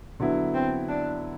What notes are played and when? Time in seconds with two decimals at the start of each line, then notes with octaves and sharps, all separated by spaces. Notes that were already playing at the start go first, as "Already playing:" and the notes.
0.20 D3 F#3 B3 E4
0.54 C4
0.88 D4